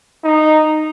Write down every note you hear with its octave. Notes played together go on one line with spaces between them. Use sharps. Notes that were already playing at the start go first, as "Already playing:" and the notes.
D#4